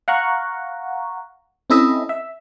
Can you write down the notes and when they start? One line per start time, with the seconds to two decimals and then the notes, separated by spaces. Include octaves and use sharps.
0.08 F5 F#5 A#5 C#6
1.70 C4 C#4 E4 A4 D#5 E5
2.09 E5